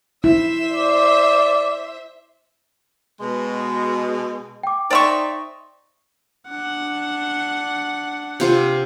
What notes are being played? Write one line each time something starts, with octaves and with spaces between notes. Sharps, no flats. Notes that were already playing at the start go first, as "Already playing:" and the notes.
E4 C5 E5
D5
B2 G#3
G5 D6
D#4 C5 D5 E5 G5 C6 C#6
D4 F#5
C3 F4 C5